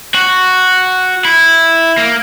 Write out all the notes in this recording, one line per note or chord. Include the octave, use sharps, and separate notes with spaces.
F#4
E4
A#3